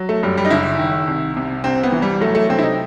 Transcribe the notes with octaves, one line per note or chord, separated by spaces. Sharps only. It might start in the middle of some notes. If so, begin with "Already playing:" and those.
Already playing: F#3
A3
F#2 G3
G3
D#4
F#1 E4
D#3
C2
C3
C2 C4
B3
E3
G3
F#3 A3
A3
C3 C4
E4
D#4